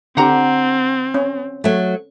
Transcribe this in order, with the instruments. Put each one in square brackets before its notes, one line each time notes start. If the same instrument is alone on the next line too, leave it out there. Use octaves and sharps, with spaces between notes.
[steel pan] D3 G4 [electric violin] C4 [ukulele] F#5 A#5
[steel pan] C#4
[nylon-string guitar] F#3 A3